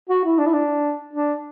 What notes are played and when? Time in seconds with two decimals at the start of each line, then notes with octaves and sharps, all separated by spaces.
0.09 F#4
0.25 E4
0.38 D4
0.46 E4
0.53 D4
1.13 D4